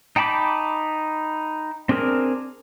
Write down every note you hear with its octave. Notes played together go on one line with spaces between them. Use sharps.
D#4 G5 A5 B5 D6
C4 D4 G#4 A#4